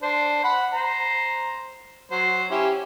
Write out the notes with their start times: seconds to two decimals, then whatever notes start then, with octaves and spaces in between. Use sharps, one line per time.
0.03 D4 C5
0.44 F#5 B5
0.73 C5 A#5
2.11 F#3 C5
2.51 C#4 E4 G4